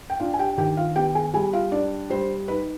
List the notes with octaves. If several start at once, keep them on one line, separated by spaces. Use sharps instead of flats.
G5
D4 F4 F5
G#5
G4 G5
D#3 G4 G5
F4 F5
B3 G4 G5
G#4 G#5
G3 G#4 G#5
F4 F5
D4 D5
G3 C5
D#4 B4